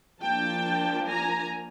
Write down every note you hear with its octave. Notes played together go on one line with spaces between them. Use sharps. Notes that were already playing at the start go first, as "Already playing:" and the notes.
F3 A#3 D4 G5 A5
G#5 A#5